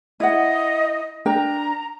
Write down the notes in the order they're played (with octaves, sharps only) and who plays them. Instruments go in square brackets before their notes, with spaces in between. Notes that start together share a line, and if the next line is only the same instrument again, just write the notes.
[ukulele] E4 F#5 [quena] D#5
[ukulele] D4 A#4 G5 [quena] A#5